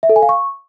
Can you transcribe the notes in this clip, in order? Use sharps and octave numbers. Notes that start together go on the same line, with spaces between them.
E5
A4
G#5
F5
C#6